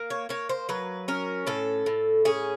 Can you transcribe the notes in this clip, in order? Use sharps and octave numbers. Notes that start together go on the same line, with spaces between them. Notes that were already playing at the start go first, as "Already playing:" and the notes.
Already playing: A#3
C#5
A#3 C#5
C5
F#3 B4
C#4 A#4
A2 A4
A2
C#4 G#4